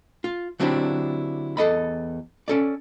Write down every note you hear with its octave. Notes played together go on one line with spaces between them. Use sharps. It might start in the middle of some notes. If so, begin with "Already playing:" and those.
F4
D3 F#3 C4 D4 E4 G4
E2 A4 D#5 B5
C#4 A4 D5